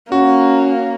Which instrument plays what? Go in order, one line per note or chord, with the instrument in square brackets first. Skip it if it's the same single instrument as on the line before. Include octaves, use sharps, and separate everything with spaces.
[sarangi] A#3 [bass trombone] C#4 [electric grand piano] F#4